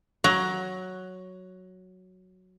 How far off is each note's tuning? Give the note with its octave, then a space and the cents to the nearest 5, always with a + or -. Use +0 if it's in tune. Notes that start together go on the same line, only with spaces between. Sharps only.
F#3 +0 A#5 +15